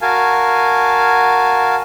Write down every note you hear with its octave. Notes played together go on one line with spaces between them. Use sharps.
F#4 A#4 F5 G#5 A5